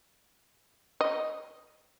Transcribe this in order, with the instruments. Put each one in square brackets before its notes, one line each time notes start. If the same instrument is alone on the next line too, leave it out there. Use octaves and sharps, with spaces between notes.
[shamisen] D#5